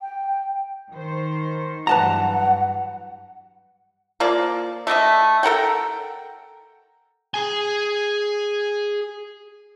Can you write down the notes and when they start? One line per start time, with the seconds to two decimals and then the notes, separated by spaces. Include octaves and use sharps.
0.01 G5
0.92 D#3 C5
1.87 G2 E3 F#3 B4 F#5 A5 A#5
4.20 F3 A#3 D5
4.87 A3 D4 D#5 E5
5.43 A4 A#4 F#5 G5
7.34 G#4 G#5